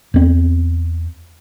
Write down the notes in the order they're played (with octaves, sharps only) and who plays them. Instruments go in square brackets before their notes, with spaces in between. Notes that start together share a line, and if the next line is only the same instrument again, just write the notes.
[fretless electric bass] E2 C4